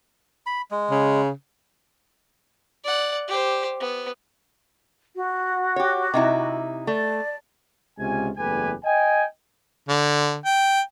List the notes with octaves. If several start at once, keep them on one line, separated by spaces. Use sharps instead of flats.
B5
G#3
C#3
D5 F#5
G4 C5
B3
F#4
G4 C#5
C3 D#4 E4
A3 D5
C#2 C3 G#3 C#4 F4 G#5
F#1 E2 A3 G4 B4 G#5
D#5 G5 G#5
D3
G5